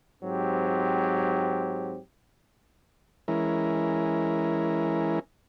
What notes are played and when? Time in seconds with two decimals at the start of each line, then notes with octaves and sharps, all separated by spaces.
0.23 G#2 F#3 C4 G4
3.28 E3 G#3 C#4 E4 A#4